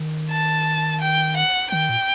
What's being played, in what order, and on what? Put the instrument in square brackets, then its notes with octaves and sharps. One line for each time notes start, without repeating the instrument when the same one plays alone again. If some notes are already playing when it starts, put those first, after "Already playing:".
Already playing: [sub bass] D#3
[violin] A5
G5
F#5
[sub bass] D#3 [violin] G5
[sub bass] A#2